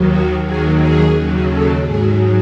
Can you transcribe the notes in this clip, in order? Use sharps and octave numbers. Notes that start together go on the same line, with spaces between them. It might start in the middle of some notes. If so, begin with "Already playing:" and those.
Already playing: D#2 D#3 F#3
F#4
D#2 D#3 F#3 G#4
G#4
D#2 C#3 F#3
A4
G#2 F#3 G#4